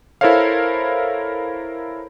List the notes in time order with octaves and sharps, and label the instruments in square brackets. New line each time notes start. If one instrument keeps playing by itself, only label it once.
[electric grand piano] E4 A4 A#4 C5 C#5 F5